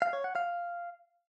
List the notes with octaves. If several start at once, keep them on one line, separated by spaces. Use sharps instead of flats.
F5
C#5
F#5
F5